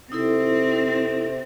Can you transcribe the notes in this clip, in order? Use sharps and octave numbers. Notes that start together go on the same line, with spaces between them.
C3 C4 D#4 E4 A4